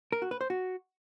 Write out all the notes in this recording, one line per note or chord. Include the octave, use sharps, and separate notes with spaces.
A#4
F#4
B4
C5
F#4